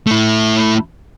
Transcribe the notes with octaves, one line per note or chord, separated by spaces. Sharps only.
A3 E4